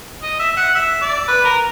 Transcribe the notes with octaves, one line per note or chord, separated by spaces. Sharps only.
D#5
E5
F#5
E5
D5
B4
A#4